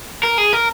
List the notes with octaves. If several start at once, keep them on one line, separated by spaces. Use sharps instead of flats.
A#4
G#4
A#4